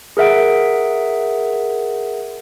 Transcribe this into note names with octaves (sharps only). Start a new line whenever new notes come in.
G#4 A#4 E5 F#5 D7